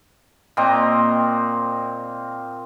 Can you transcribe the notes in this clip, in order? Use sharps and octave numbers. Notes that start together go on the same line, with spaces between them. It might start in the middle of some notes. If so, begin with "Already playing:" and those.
A#2 C4 D#5 A#5